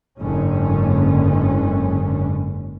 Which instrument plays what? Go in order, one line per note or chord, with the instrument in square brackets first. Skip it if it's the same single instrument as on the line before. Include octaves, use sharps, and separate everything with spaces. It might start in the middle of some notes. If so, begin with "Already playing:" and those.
[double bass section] F#1 G#2 D3 C#4